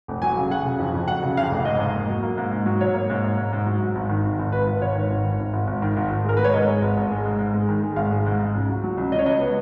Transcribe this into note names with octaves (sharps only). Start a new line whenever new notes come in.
F1
F#3 G#5
C#3
F#3 F#5
C#3
F2
F2
F#3 F#5
C#3
F2 F5
F1
G#2 D#5
G#2
A#3
F#3
A#3
G#2
G#2
F#3
G#2 C#5
A#3
G#2
G#2
G#2
G#2
F#3
G#2
G#1
D#3
G#1
G#1
G#1 B4
G#1
G#1 C#5
D#3
G#1
D#3
G#1
G#1
G#1
D#3
G#1
G#1
G#3 A#4
G#3 B4
C#5
G#2 D#5
G#3
G#1
G#1
G#3
G#2
G#2
G#3
D#3
G#3
G#1 F5
G#3
G#2
G#2
C#2
F#3
F#3
C#2
C#2 D#5
C#5
C#2 D#5
B3